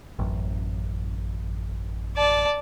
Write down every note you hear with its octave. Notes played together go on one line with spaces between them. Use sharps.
A1 F#2
D5 A5